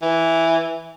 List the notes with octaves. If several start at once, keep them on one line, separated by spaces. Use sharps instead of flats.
E3